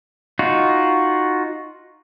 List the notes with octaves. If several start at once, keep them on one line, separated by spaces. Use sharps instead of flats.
D#4 F4 F#4